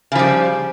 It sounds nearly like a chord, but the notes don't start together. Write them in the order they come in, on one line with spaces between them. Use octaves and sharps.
C#3 F3 G3